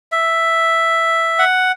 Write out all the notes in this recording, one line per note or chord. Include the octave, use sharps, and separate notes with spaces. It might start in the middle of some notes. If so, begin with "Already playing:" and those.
E5
F#5